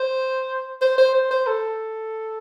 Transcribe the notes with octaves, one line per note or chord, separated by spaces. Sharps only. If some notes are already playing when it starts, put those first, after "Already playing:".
Already playing: C5
C5
C5
C5
C5
A4